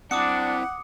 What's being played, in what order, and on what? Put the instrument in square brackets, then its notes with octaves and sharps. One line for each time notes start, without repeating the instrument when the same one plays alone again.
[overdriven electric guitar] C4 E4 [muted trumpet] D4 [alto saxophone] F#5 [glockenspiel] D6 D#6 C#7